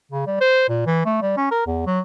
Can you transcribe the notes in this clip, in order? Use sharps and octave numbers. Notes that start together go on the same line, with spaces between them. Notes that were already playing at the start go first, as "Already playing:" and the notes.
C#3
G3
C5
A#2
E3
A3
G3
C#4
A#4
E2
F#3